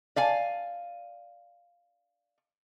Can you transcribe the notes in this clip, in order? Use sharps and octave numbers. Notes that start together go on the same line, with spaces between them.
D5 F5 G#5